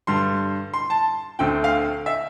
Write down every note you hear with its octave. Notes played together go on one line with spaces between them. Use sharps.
G2 D3 G3 C6
C6
A5
D2 D3 A3 C4 G5
F5
E5